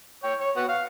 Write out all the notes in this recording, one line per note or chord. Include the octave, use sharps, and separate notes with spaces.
C#5 G5
C#5
B3 F#4
F5